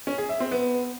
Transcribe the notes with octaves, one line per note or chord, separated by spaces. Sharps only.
C#4
G#4
E5
C4
B3